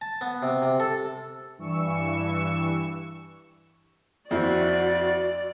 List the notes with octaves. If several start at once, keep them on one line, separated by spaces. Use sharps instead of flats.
A5
B3
C3
C3
A4
G2 E3 C#6 E6
F2 C4 E4 F#4 D5